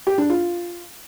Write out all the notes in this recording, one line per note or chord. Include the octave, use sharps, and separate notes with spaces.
G4
D4
F4